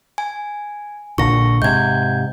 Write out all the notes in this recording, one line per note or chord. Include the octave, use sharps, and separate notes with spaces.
G#5
A#1 A#2 D3 C#6 A#6
G#2 C3 G6 G#6